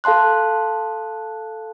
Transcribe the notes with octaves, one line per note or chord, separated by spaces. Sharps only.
A4 F5 A5 C6 F#6